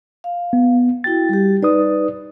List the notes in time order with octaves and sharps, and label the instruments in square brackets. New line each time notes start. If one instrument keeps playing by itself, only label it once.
[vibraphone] F5
[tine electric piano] B3
[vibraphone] E4 F#4 G5 [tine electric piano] A6
[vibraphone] G3 G4
[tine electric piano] D#4 B4 D#6 [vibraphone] D5